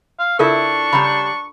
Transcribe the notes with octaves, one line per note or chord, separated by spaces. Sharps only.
F5
C#3 D4 E4 F4 A4 A#4 C#6
C#3 G3 A#5 B5